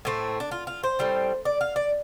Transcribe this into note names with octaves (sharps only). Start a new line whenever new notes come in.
A2 A3 C4
D4
F4
F4
C5
A2 G3 C4
D5
F5
D5